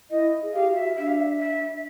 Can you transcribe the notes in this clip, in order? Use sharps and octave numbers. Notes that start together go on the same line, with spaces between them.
E4 D#5
G#4
G4 F5
F#4
E5
D4 E5
F5
E5
E5